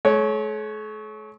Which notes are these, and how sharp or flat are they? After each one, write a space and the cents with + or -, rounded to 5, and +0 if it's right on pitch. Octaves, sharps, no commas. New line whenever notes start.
A3 -45 C#5 +0